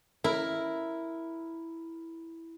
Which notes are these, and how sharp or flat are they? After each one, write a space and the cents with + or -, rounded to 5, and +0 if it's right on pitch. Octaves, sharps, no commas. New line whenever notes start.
E4 +0 A#4 +0